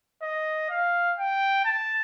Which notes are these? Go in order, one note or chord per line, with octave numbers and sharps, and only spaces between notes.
D#5
F5
G5
A5